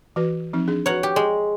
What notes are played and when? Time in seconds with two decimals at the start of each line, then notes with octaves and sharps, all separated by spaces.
0.16 E3 F#4 B4
0.53 F3 C4 D#4
0.68 D4 G#4
0.86 F#4 B4 C#5 F#5 A#5
1.03 G4
1.16 G#3